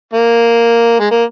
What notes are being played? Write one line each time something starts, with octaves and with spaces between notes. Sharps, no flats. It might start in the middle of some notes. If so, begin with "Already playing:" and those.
A#3
G#3
A#3